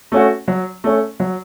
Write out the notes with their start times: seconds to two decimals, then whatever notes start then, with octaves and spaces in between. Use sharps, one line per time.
0.12 A3 C#4 F#4
0.48 F#3
0.84 A3 C#4
1.20 F#3